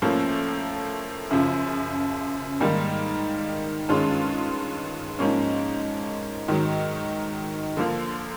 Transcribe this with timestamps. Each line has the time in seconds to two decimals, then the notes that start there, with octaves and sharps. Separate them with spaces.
0.02 A2 F3 A#3 C#4
1.31 F#2 C#3 F3
2.60 G#2 D#3 G3 A#3
3.89 G2 D#3 G#3 C#4 F4
5.19 G#2 F3 A#3 C#4
6.48 G#2 D#3 F#3
7.77 D3 F3 A#3